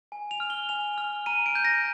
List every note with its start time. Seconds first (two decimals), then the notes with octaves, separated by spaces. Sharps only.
0.12 G#5
0.31 F7
0.40 F6
0.50 G7
0.69 G#5 F7
0.98 F6
1.26 A#5 D#7
1.46 D7
1.55 G6
1.65 A#6